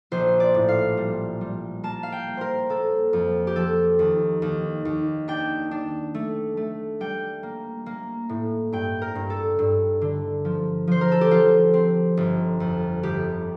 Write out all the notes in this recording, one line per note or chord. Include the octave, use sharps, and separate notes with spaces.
A#1 C5
D5
A2
F5
G3
G3
A#3 A5
F5
G5
A#3
A#4 C5
A#3 A4
F2
G4
F3 A4
D#2
D#2
D#2
D4 G5
D4
A3
A3
G3 G5
A#3
A#3
A2
G2 G5
A#4
G2
A4
G2
D3
F3
F3 C5
A#4
A4
G4
F3 F4
C4
G1
F2
G1 G4